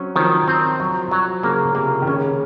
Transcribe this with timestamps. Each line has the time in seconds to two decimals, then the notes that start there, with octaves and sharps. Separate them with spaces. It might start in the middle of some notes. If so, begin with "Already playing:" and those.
Already playing: F#3 C4 C#4
0.16 D#3 F3
0.48 C4
0.80 F#3
1.11 F#3
1.43 C#3 A#3
1.75 C3 A#3
2.02 D#3
2.07 C#3 C#4